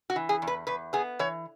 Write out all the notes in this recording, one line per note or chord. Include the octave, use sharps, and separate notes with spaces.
F#4
E3
G#4
E2
B4
E2 B4
B3 G#4
E3 C#5